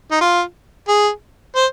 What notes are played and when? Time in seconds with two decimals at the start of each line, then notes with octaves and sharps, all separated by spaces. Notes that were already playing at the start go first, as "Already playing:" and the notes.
0.11 D#4
0.21 F4
0.88 G#4
1.56 C5